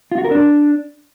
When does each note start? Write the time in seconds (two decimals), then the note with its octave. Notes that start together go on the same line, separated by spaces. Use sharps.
0.12 F4
0.18 F#4
0.25 A#4
0.31 D4